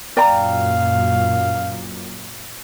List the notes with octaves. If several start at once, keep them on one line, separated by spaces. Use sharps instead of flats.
F#2 A#2 D5 F5 G5 A#5